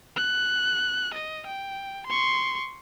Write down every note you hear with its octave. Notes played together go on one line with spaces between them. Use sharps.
F#6
D#5
G5
C6 C#6